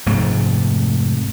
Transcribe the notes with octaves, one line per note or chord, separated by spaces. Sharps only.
F1 G#2 C3 A3